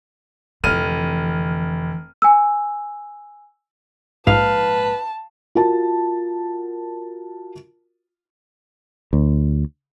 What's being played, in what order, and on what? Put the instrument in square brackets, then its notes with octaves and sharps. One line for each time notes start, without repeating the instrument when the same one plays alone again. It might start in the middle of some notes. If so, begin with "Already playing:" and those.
[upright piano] F1 F6 D#7 [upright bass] D3 E3
[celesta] G#5 E6
[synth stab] A#1 G#2 [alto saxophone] B4 [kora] F5 [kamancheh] A5
[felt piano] F4 F#4 A#4 A5
[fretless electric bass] D2